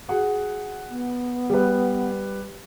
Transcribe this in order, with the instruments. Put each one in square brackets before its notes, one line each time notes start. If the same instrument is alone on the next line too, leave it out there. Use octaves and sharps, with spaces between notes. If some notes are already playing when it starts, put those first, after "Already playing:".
[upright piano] F#4 G#4 F#5
[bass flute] B3
[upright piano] G3 B4